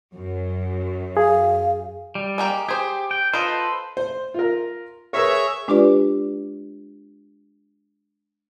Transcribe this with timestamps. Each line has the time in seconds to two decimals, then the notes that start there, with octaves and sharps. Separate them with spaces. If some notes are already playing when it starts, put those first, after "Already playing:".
0.14 F#2
1.17 G#4 F5
2.15 G3
2.38 G#3 A#3 G4
2.69 G4 G#4 C5
3.11 G5
3.34 F4 A4 B4 C5 D#5
3.97 C5
4.34 F4 A#4
5.13 G#4 A#4 B4 C#5 E5
5.68 G#3 D4 F4 G4 B4 D5